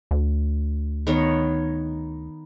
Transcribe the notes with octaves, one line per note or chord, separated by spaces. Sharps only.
D2
D#3 B3 C#5